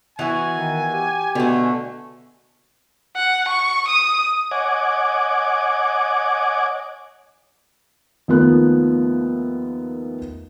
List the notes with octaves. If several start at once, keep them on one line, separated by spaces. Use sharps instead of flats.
E3 B3 F#4 G#5
D#3
G4
B2 D3 A3
F#5
C#6
D#6
C#5 D#5 F#5 G#5 D6
D#2 F3 A3 B3 A#4 F#6